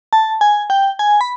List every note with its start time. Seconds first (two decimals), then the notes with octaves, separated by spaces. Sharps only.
0.13 A5
0.41 G#5
0.70 G5
0.99 G#5
1.21 B5